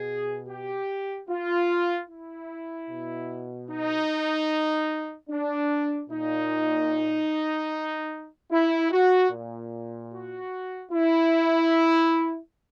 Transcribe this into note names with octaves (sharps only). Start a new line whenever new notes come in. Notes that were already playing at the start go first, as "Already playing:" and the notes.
Already playing: B2 G#4
G4
F4
E4
B2
D#4
D4
A#2 D#4
E4
F#4
A#2
F#4
E4